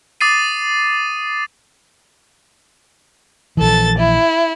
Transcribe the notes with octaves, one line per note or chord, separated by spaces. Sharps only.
D6 D#6 A6 C7 D#7
A#1 E3 A4 A6
E4